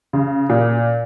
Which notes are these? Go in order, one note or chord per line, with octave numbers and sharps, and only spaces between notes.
C#3
A#2